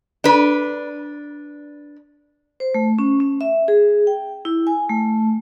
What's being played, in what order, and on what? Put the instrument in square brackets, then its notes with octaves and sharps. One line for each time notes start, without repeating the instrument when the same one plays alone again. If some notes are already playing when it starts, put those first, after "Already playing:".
[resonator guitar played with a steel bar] D4 B4
[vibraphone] C5
A3
C#4
C#4
E5
G#4
G5
E4
G#5
A3